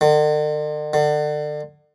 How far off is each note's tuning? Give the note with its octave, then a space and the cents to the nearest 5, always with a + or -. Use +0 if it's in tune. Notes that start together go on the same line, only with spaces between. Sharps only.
D3 +45
D3 +30